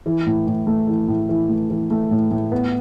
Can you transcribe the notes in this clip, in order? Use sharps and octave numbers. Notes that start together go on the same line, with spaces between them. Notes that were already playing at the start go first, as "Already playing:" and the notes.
E3
A2
A2
A3
E3
A2
E3
A3
E3
A3
A2
A2
B3